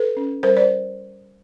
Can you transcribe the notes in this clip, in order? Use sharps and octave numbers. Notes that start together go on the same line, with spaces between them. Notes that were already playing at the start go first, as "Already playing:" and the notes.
Already playing: A4 B4
C#4
G3 A#4 C5
C5 D5